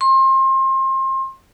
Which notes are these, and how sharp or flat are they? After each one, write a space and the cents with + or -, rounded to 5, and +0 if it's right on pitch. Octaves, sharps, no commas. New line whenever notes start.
C6 +30